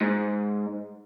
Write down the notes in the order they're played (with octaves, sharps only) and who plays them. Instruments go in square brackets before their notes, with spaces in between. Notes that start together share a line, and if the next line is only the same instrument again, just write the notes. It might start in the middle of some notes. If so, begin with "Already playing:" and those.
[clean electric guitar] G#2